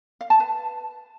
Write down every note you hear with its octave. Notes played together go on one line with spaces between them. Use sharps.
F5
A5
B4